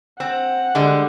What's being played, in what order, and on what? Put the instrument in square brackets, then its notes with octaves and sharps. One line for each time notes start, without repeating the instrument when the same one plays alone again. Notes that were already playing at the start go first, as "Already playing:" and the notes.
[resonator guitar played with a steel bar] C4 [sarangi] F#5
[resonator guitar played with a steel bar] D3 G3 G#3